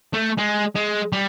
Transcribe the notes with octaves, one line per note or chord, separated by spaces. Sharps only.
A3
G#3
G#3
G3